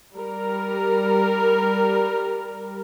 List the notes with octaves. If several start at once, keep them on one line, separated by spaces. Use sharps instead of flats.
G3 A#4